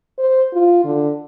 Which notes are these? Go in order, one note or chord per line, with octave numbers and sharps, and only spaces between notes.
C5
F4
D3